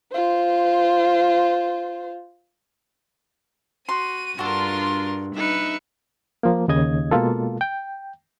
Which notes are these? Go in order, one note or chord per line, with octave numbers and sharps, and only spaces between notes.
F4 C5
F#4 C6 D#7
G2 D4 F4 F#4 A4 A#4 C6
D#4 B4 E5 C#7
F3 A#3
D#2 C#3 D#5 G#6
B2 G#3 A#3 F4 A4
G5